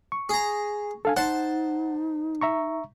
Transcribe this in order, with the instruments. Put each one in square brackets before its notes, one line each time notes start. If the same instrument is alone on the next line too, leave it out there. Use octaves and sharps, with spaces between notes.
[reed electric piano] C#6
[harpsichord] G#4 A#5 [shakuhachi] G#5
[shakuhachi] D4 [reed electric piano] A4 F5 G#5
[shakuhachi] D#4 [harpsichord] C5 A5 [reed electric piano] F#5
[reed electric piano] E5 A#5 C#6